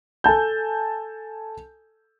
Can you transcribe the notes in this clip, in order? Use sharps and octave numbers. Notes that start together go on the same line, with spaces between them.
A4 G#5 A5 G6